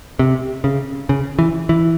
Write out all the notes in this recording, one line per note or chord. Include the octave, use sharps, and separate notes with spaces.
C3
C#3
C#3
E3
E3